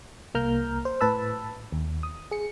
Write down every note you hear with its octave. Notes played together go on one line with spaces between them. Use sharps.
C2 A#3 A#5 F6 G6
C5
A2 B4 A5 B5 E6
D#2
D#6
G#4 C#7